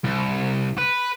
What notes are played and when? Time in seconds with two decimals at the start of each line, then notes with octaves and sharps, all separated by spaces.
0.04 C2
0.78 B4